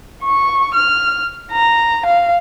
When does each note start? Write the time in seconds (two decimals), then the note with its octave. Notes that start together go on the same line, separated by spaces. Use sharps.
0.24 C#6
0.74 F6
1.52 A#5
2.05 F5